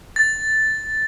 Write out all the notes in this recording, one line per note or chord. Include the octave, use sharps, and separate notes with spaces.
A6